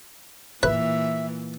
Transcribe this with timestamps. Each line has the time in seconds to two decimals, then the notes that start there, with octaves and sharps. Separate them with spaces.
0.63 A#2 E3 B4 E5